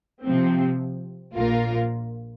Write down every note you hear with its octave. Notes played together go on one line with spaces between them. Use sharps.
C3 F3 C4
A#1 A#2 A#3 F4 A#4